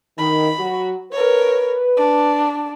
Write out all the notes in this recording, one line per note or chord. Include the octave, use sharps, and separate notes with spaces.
D#3 B5
F#3 F#4
A#4 B4 C#5
D4